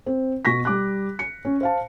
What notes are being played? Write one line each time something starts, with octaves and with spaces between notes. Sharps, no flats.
C4
B2 C#6 A#6 B6
G3 D6 F#6
C#7
C#4
C5 F5 A5